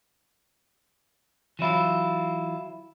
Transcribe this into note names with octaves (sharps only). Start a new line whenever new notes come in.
E3 F#3 E4 F4